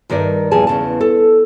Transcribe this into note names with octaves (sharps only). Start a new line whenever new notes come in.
G2 D#3 A#4 D5 E5
E2 A#2 F3 G3 G#4 A5
E2 C#3 A5
A4